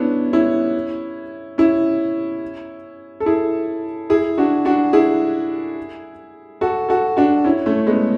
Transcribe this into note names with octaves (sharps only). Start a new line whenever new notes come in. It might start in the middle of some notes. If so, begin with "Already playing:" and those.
Already playing: B3 C#4 D4 E4
C#4 E4
C#4 E4
A4
E4 G#4
E4 G#4
D4 F#4
D4 F#4
E4 G#4
F#4 A4
F#4 A4
D4 F#4
C#4 E4
A3 C#4
G#3 B3